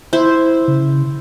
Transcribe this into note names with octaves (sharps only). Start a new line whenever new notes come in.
E4 C5
C#3